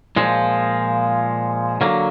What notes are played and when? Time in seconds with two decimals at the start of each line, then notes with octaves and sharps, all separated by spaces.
0.16 A#2 F3 G#3
1.81 D3 F#3 A#3